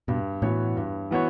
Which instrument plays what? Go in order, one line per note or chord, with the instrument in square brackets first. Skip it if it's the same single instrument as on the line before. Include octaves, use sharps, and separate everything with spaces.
[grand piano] G2 [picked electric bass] B2
[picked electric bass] A2 [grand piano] E3 B3 F#4 C#5
[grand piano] G2
E3 B3 F#4 C#5